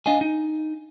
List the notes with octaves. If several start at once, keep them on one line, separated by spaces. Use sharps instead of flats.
D4 D#5 F5 G#5
D#4